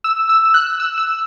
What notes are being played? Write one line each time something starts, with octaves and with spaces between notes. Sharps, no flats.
E6
E6
F#6
E6
E6